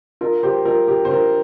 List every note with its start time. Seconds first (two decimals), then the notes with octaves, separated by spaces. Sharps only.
0.21 F4 A#4
0.43 G4 C5
0.65 F4 A#4
0.88 G4
1.05 C5
1.10 F4 A#4